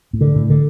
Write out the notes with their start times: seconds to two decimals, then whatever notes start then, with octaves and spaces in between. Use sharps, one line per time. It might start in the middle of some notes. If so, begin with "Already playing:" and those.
0.13 A2
0.21 D3
0.36 A2
0.50 D3